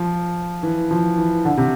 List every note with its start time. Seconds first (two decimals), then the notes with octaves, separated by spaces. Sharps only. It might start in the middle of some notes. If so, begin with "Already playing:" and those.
Already playing: F3
0.63 E3
0.91 F3
1.18 E3
1.45 D3
1.57 C3